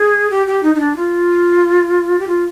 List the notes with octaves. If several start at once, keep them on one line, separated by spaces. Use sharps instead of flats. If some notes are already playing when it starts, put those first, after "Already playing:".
Already playing: G#4
G4
G4
D#4
D#4
D4
F4
G4
F4